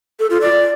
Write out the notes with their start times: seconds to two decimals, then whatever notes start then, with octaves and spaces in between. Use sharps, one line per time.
0.19 A4
0.30 F4
0.41 D5